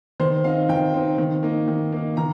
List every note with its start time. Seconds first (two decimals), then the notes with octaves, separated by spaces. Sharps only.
0.20 D#3 C5
0.44 C4 D#4 F5
0.69 D#3 G5
0.94 C4 D#4
1.18 D#3
1.43 A#3 D#4
1.68 D#3
1.92 A#3 D#4
2.17 D#3 A#5